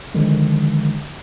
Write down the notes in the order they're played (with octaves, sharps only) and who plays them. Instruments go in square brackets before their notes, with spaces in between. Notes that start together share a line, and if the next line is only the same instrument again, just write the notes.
[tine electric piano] D3 D#3 F3 G#3